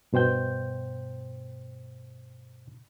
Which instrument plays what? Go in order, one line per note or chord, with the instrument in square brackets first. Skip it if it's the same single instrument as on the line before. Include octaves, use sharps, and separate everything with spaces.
[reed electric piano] G2 B2 C5 G5 G6